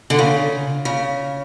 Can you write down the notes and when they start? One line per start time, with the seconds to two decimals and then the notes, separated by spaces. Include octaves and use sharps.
0.10 D3
0.19 C#3
0.85 C#3